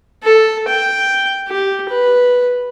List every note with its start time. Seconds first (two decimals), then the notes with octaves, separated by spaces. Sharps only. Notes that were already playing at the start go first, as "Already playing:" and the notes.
0.24 A4
0.69 G5
1.49 G4
1.89 B4